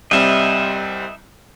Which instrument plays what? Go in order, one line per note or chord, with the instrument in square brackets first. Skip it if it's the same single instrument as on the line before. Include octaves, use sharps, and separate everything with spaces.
[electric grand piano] C2 G3 C4 [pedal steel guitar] D#5 E5